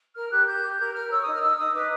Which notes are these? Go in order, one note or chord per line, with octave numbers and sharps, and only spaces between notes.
A#4 F6
G4 F#6
G4 G6
G4
A#4 G6
A#4 F6
C#5 E6
D#6
D#4
F6
D#4 E6
D#4 D#6
B4 D6